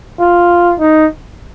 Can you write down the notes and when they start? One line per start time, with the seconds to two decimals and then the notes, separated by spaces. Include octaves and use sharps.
0.20 F4
0.80 D#4